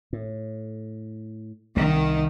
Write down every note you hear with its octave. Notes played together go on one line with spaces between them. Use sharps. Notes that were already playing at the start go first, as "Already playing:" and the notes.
A2
C2 D#3